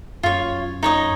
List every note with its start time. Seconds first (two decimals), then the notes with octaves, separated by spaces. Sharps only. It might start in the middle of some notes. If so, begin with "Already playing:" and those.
0.23 F#2 F4 C#5
0.83 D#4 C#5 D#5